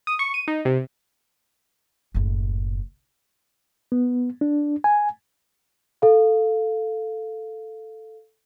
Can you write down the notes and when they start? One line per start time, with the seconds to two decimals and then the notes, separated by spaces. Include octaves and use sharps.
0.07 D#6
0.19 C#6
0.34 D#7
0.48 D#4
0.65 C3
2.14 F#1 A2
3.92 B3
4.41 D4
4.84 G#5
6.02 A4 F5